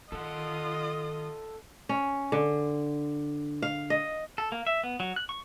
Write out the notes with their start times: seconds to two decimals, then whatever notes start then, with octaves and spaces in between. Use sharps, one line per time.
0.12 D#3 F4 A4 D#5 F#5
1.89 C#4
2.32 D3
3.62 F5
3.90 D#5
4.38 A4
4.52 A#3
4.67 E5
4.84 B3
5.00 F#3
5.16 F#6
5.29 C#6